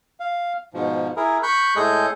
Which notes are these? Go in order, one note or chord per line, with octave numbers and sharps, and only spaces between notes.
F5
G#2 B2 F3
E4 G#4 A#4
B5 C#6 F#6 G6
A2 G#3 G#4 A4 D#5 G6